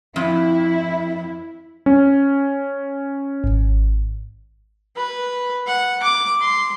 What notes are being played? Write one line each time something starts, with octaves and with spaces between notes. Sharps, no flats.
F2 E4
C#4
G#1
B4
F#5
D6
C6